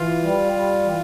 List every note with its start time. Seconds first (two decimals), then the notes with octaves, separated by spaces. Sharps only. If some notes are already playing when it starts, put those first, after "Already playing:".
Already playing: E3 F4 F5
0.22 G3
0.52 G3
0.83 E3